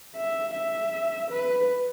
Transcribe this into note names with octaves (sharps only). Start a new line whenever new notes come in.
E5
E5
B4